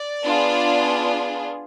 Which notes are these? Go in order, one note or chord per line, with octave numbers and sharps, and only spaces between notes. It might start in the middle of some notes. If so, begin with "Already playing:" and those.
Already playing: D5
B3 D4 F4 G#4